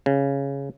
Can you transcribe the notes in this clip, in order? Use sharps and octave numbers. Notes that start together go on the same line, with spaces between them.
C#3